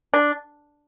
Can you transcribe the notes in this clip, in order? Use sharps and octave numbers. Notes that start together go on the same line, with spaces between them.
D4